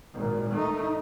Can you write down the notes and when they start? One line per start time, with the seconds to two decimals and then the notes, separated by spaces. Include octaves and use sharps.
0.14 G#1 A#2
0.54 A3 D#4